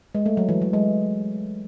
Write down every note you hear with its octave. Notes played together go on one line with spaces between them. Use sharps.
G#3
A3
F#3
E3
F#3
G#3